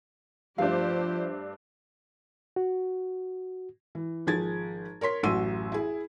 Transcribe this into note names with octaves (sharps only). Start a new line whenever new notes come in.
G2 F3 A3 D4 G4 C5 F5
F#4
E3
G#1 F3 G#4 G#6 A6
A#4 C#5 C6 B6
A1 F#2 F#4 C6 E6 D#7
E4 G#4